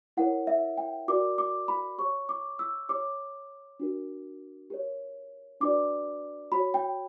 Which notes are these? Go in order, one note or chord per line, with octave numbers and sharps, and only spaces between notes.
E4 A#4 C#5 F#5
E5
G5
F#4 A#4 D5 D6
D6
B5
G4 C#5 C#6
D6
E6
G4 C#5 D6
D4 F#4 A#4
G4 A#4 C#5
D4 F#4 B4 D5 D6
F#4 C#5 B5
G5